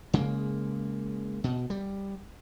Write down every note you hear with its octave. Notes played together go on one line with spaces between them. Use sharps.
C#3 G#3 A#3
B2
G3